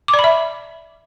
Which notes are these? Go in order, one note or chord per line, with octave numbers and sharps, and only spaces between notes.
D6
D5
B5
E5